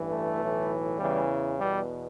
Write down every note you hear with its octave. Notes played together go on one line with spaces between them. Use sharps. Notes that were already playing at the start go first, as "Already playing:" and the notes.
Already playing: A1 G2 E3
A3
B1 A2 E3
E2 C#3 E3 G3
E2 B2 G3